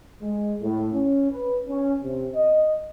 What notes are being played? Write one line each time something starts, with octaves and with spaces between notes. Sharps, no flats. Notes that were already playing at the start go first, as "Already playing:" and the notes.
G#3
A2
C#4
B4
C#4
C3
D#5